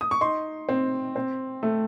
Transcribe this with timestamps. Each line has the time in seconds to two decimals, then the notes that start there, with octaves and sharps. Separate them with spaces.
0.01 D#6
0.11 C#6
0.21 D#4 C6
0.69 C4
1.16 C4
1.63 A3